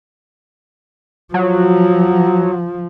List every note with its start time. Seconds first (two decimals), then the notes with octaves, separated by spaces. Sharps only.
1.34 F3 F#3